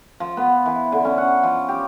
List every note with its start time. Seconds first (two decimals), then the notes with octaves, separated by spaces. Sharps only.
0.20 F3
0.37 B3
0.66 E3
0.92 D3
1.05 C#4
1.18 F#5
1.43 F3
1.68 G4